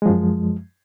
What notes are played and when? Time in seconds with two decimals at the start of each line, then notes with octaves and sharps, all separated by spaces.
0.02 G#3
0.06 F3
0.09 F#2